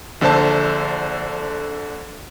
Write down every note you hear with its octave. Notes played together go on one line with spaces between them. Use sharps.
A#1 D3 A4 C5 A5